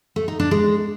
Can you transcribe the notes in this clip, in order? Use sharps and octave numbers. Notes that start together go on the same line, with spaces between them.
A3
D#4
D4
G#3